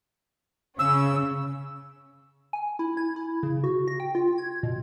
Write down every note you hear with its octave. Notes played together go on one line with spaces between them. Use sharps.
C#3 C#4 E6
G#5
E4
G#6
E4
C#3
F#4
A#6
G5
F4
G#6
B2